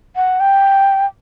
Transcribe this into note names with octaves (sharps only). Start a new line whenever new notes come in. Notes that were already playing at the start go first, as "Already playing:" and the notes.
F#5
G5